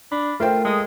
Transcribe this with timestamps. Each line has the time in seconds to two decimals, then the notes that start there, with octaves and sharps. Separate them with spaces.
0.12 D4 B5
0.40 A3 F4 A#4 C5 G5
0.65 G#3 A4 D#6